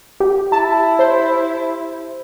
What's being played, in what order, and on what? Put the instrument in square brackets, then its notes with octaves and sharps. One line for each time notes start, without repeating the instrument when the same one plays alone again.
[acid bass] G4
[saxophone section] E4 [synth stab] A5
[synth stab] C5